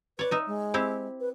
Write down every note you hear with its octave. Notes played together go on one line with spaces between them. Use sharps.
B4 C#5 D5
D#4 E5
G#3
C4 E4 G4
B4